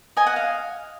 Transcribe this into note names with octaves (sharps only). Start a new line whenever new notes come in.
D#5 G#5
F#5
F5